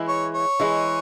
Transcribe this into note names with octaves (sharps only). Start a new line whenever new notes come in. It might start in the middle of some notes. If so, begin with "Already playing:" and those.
Already playing: E3 G#3 E4
C#5
C#5
E3 G#3 E4